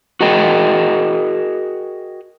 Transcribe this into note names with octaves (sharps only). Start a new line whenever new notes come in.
F#4 G#4 A#4 D#5 G5